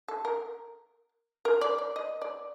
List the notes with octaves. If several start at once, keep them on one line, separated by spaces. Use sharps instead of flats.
A4
A#4
A#4
D5
D5
D#5
D5